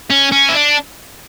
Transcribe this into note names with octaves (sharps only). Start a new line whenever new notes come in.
C#4
C#4
E4
D4